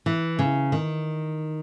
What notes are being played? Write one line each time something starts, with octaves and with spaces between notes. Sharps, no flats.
E3
C#3
D#3